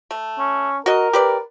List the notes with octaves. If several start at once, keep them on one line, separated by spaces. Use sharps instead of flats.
A3
C#4
F#4 A#4 D#5
G4 B4 D5